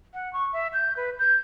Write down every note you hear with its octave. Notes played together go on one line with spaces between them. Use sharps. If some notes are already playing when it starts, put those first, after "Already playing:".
F#5
C#6
E5
G6
B4
G6